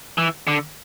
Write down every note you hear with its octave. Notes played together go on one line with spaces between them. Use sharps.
E3
D3